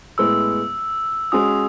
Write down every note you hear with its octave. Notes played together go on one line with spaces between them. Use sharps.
A2 G#3 B3 E6
G#3 C#4 F#4 D#6